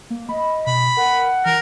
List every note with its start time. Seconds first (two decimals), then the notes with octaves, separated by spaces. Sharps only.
0.10 A#3
0.29 D#5 B5
0.67 B2 B5
0.97 A#4 F#5
1.45 E3 A#4